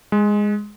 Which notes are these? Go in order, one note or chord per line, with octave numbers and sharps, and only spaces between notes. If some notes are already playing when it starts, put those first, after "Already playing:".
G#3